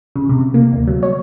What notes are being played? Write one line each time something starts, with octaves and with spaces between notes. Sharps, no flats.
C#3
C3
A#3
D2
F#3
C#5